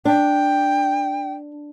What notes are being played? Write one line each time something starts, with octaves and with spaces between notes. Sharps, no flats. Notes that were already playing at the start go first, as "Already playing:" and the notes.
D4 G5